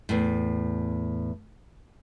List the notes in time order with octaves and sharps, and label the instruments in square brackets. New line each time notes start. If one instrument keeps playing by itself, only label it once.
[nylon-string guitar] E2 A2